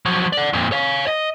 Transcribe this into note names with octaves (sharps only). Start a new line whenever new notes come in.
F3 F#3
D5 F#5
F2 A#2
C#5 F5
D#5